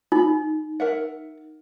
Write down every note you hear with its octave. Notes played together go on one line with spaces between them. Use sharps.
D#4 B5
A#4 E5 F#5